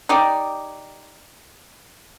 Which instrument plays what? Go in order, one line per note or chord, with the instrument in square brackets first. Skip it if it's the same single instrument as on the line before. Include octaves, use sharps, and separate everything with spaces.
[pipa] D#4 G4 D5